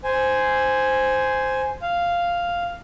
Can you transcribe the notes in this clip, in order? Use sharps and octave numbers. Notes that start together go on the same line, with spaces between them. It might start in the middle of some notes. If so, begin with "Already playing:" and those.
C5 G#5
F5